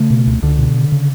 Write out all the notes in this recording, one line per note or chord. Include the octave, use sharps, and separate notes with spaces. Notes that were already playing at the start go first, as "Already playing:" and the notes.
Already playing: C#3 A3
B2
C#2
C#2 D3
B2
C#3
C#3